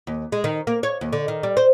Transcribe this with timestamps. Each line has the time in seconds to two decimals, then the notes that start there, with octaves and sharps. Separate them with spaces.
0.07 D#2
0.32 G#3
0.44 D#3
0.67 A#3
0.83 C#5
1.01 D#2
1.13 D3
1.28 D#3
1.43 G3
1.57 C5